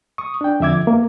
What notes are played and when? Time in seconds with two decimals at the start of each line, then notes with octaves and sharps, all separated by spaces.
0.18 C#6 D#6
0.41 D4 G5
0.60 F2 D3 E5 D6 G#6
0.87 A#3